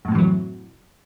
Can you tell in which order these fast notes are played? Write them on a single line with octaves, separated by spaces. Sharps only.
F#2 A2 C3 E3 F#3